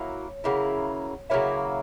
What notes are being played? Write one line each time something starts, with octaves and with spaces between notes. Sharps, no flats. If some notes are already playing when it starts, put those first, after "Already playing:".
Already playing: F#3 A#3 E4 C#5
C#3 F#3 A#3 E4
C#3 F#3 A#3 E4 C#5 E5